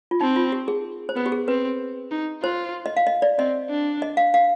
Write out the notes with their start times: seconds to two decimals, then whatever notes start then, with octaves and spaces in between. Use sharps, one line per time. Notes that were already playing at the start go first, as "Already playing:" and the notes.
0.11 F4
0.21 C4 D#4
0.36 F4
0.52 G4
0.68 G#4
1.09 C5
1.16 B3 B4
1.26 G4
1.32 G#4
1.48 C4 B4
2.11 D#4
2.43 F4 C5
2.86 D#5
2.97 F5
3.07 D#5
3.22 D5
3.38 C4 D#5
3.70 D4
4.02 D#5
4.17 F5
4.34 F5